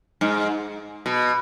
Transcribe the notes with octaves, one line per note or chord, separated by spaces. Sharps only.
G#2
B2